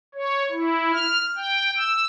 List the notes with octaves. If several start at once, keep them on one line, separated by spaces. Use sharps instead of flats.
C#5
E4
F6
G5
E6